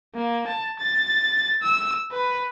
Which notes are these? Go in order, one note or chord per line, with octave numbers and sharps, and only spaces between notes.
A#3
A5
A6
E6
B4